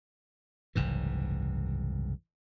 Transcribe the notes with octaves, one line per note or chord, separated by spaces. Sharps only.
F#1 C2 G#2 E3